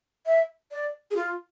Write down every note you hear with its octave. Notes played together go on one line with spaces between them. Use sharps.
E5
D5
G#4
F4